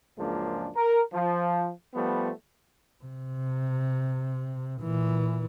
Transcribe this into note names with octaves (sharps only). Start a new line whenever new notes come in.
C#2 F#2 F3 G#3 A#3 D4
A#4
F3
F3 G3 A3 B3
C3
A#2 E3